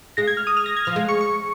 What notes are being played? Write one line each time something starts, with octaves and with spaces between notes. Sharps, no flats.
G#3 A#6
G#6
F6
D#6
F6
A#6
G#6
F3 F6
G#3
C#6
C#6